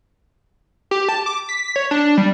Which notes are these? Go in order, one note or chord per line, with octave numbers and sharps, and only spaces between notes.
G4
A5
D6
B6
C#5
D4
G3